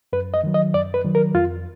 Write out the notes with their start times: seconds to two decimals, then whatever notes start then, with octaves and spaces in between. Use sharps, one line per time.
0.13 F#2 B4
0.34 D#5
0.44 D#3 F#3
0.54 D#5
0.74 F#2 D5
0.94 B4
1.04 D#3 F#3
1.15 A#4
1.34 F2 F4